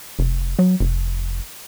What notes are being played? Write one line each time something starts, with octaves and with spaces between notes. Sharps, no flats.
F1
F#3
F1